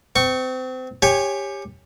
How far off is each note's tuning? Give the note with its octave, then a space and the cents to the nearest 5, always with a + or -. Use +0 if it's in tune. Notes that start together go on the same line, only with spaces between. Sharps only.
C4 -30 C#6 +0
G4 +20 C#5 -10 G#5 +0